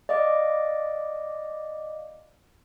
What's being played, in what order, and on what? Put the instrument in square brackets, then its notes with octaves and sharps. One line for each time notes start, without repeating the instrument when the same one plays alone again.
[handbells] D5 D#5 F5 D6